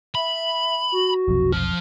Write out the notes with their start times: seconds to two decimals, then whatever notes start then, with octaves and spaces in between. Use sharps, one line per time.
0.15 E5 B5
0.92 F#4
1.28 F1 B1 F2
1.53 F3 F6